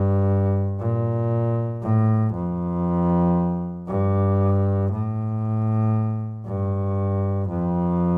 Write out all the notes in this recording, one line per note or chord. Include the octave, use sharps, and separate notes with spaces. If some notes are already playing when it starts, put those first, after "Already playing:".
Already playing: G2
A#2
A2
F2
G2
A2
G2
F2